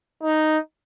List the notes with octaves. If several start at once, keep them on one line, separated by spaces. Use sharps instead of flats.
D#4